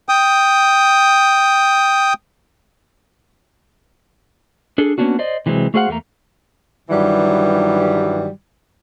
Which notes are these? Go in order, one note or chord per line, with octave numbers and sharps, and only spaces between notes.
G5 D#6
D4 G#4 A4
A#3 B3 C#4 D4 F#4
C5 D5 D#5
C3 E3 F#3 G#3 C4
A3 F#4 G#4 C5 F5 F#5
E2 A3 A#3 A#5
G2 D#3 E3 F#3 G3